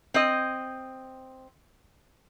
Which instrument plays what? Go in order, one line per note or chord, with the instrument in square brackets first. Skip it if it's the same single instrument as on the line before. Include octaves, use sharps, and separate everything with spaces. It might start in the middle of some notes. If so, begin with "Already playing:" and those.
[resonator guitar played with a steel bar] C4 D#5